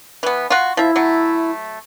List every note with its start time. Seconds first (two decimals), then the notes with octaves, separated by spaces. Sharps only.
0.23 E3 B3
0.50 F4 F#4
0.77 F3 E4 E5
0.96 F#3 A3